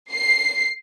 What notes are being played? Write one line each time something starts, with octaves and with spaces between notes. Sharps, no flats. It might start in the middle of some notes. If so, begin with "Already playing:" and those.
C7